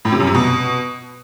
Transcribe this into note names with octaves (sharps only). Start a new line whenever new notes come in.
A2
C3
F#2
C3
B2